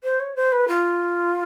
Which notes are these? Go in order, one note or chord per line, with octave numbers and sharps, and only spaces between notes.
C5
C#5
C5
B4
F4